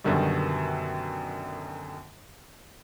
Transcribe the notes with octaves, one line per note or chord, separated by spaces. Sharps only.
F#2 B2 D3 D#3 G3